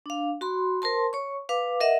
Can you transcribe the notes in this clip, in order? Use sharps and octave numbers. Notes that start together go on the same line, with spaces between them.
D4 F5
F#4 B5 C6
A#4 C5 A5 C6
C#5 C#6
B4 F5 D6
A#4 D#5 E5 F#5